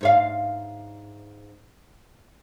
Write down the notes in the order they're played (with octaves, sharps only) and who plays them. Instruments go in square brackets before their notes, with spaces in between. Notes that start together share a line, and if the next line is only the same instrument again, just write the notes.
[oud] G#2 C#5 F5